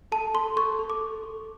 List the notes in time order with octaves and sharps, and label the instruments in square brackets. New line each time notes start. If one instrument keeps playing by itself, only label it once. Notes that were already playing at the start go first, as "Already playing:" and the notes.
[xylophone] A4 A5
A4 C6
A4 C#6
A4
D6
A4
A4